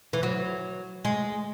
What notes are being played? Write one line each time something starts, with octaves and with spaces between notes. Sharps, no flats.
E3
F#3
G#3